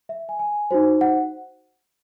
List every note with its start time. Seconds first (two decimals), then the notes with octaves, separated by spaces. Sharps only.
0.09 E5
0.29 G#5
0.39 G#5
0.71 D#4 F#4 C5
1.01 F#5